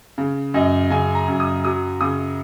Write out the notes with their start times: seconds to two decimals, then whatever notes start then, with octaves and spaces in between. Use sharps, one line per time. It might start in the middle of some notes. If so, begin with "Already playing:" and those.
0.18 C#3
0.54 F#2 D#5
0.90 C#3 G#5
1.15 A#5
1.28 F#2
1.40 D#6
1.65 F#3 D#6
2.01 C#3 D#6